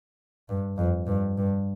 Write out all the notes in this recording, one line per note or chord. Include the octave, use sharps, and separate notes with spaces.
G2
F2
G2
G2